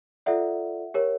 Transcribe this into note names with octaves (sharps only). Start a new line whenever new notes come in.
F4 A4 D5 E5 F#5
G4 A#4 C#5